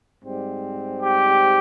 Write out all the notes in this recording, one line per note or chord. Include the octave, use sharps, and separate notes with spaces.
G#2 G3 C4
G4